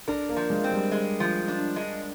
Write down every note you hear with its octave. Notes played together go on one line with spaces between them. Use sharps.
D4 A#4
A#3
F3
G#3
C4
G3
G#3
F3
D4
G#3